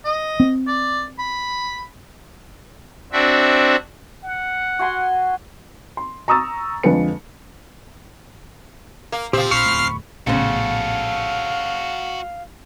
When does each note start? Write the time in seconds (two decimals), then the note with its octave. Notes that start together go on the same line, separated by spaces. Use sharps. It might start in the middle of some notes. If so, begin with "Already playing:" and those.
0.05 D#5
0.40 C4
0.67 D5
1.19 B5
3.12 C4 D4 F#4 E5
4.24 F#5
4.79 F#4 G#5 C6
5.97 C6
6.28 A#5 C#6 D#6 E6 A6
6.83 F2 D3 G#3 B4 C#7
9.12 A#3
9.33 A#2 C#3 F3 C4 G4
9.51 A#1 B5 C#6 F6 C7
9.66 D1 E2 A3
10.27 A#1 A2 C#3 B3 F#4 A4 C5 F5